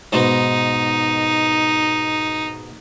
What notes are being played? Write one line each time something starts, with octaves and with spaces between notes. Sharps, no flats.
G#2 B2 D#4